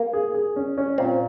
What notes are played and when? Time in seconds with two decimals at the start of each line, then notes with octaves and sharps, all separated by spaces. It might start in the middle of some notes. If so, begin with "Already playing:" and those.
Already playing: A#3
0.13 G#4
0.34 G#4
0.56 C#4
0.78 C#4
0.98 A#2 C4